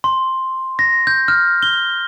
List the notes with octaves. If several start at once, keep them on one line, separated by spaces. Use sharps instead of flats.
C6
A#6
G6
F6
G7